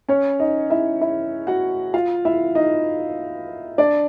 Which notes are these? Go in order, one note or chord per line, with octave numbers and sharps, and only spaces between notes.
C#4 C#5
D#4 D#5
E4 E5
E4 E5
F#4 F#5
F4 F5
E4 E5
D#4 D#5
D4 D5